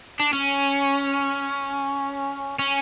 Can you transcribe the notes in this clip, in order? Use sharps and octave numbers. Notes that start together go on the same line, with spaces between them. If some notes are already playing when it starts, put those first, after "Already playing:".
D4
C#4
C#4